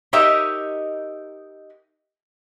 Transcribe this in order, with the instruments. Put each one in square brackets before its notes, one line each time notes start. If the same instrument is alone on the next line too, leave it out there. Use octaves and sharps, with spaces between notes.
[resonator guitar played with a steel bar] D#4 G4 A#4 C#5 D#5 E5